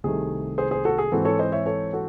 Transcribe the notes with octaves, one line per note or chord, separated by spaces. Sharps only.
C2 C3 D#3 A3 G#4
G#4 C5
G#4 C5
F#4 A4
G#4
G#2 E3 C4 F#4 A4
A4 C#5
C5 D#5
C#5 E5
A4 C#5
F#4 A4